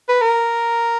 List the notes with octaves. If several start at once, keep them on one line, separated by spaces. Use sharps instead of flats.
B4
A#4